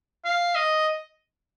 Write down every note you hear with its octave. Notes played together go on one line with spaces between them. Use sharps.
F5
D#5